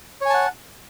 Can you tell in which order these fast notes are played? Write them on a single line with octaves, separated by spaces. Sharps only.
C#5 G#5 A5 F#5